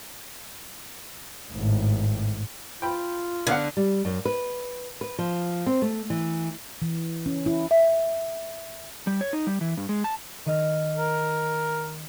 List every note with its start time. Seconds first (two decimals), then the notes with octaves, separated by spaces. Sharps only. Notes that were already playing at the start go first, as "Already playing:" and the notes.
1.53 G#1 A2
2.82 F4 G5 B5
3.47 D3 B3 F5 F#5
3.77 G3
4.05 F#2
4.25 B4
5.01 B4
5.19 F3
5.66 C4
5.82 A3
6.10 E3
6.82 E3
7.26 C#4
7.46 E4
7.71 E5
9.07 G3
9.21 C#5
9.33 D#4
9.47 G3
9.61 E3
9.77 G2
9.89 G#3
10.04 A5
10.46 D#3 D#5 F6
10.97 A#4